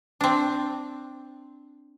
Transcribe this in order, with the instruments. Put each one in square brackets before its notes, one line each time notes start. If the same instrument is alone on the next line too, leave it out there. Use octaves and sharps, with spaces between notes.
[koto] C4 D4